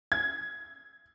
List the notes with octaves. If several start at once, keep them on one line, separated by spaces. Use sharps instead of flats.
G#6